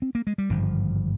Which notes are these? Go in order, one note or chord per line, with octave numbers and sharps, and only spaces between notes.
C4
A#3
G#3
G3
G#1 G2 D3 F3